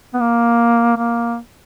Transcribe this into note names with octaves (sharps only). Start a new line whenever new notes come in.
B3
A#3
A#3